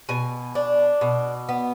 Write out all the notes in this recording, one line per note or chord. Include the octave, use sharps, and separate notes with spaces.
B2 G#5
D4
B2
B3